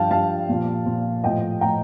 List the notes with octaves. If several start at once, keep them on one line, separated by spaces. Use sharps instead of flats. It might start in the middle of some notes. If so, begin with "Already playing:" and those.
Already playing: G2 F3 F5 G5 A5
G2 F3 F5 A5
A#2 F3
A#2 F3
A2 F3 D#5 G5
A2 F3 G5 A#5